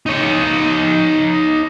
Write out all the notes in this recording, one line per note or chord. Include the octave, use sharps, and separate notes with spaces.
D#4 C#5